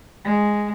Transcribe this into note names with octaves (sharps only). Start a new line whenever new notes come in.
G#3